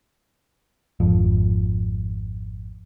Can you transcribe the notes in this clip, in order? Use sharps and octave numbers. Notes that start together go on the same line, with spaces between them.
G#1 F2